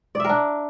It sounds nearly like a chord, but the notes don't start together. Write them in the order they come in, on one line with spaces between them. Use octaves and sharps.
D5 E5 A#4 D4